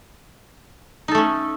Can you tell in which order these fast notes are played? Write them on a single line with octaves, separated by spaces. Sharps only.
D#4 A4 A3 C#4